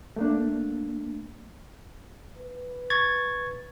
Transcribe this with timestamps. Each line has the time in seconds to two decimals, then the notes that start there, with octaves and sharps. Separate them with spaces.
0.16 A3 A#3 D4
2.37 B4
2.90 C#6 G#6 A6